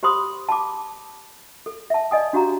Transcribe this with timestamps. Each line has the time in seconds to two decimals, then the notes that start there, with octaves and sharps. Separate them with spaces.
0.03 G4 C5 B5 C6 D#6
0.49 A5 B5 D6
1.66 A4
1.90 E5 A5
2.11 D5 D#5 G#5 D#6
2.33 D4 F#4 G4 F5 A#5